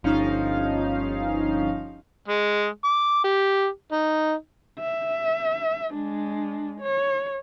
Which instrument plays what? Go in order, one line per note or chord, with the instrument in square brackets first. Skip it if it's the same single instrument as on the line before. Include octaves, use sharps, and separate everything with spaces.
[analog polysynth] G1 F3 C#4 D#4 F5
[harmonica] G#3
D6
G4
D#4
[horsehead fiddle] E5
G#3 D4
C#5